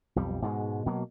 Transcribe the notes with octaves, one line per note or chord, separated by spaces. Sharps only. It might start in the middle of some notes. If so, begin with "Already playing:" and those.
B1 F2 G3
G#2 B2 G#3
B2 F#3 A#3